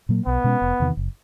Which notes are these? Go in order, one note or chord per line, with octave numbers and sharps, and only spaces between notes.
A#2 F#3 A#3
B1 B3
B2 G#3 C#4
F1
E2 C3 D#3
F#1